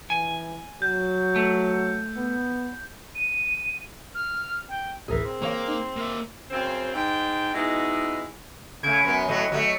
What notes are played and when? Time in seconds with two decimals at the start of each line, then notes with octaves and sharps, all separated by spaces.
0.10 E3 G#5
0.82 F#3 G6
1.36 A3
2.17 B3
3.15 D#7
4.15 F6
4.69 G5
5.08 A1 D2 B2 E3 G#4 A#4
5.25 C4
5.42 E3 A#3 C#5 F5
5.68 D#4
5.96 A#3 E5
6.51 F#2 C#3 C4
6.95 G#2 D#4 G5
7.54 G#3 B3 D#4 E4 F#4
8.83 C#3 A3 G#6 D7
9.05 F#2 B3
9.28 A2 F#3 A3 D#5
9.52 F#3 G#3 A3